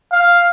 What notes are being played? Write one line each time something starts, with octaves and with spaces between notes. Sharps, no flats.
F5